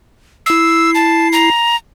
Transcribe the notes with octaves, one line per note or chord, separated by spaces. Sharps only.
E4 E6 C7
A5
A#5